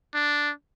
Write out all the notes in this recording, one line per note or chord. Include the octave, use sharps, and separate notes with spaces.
D4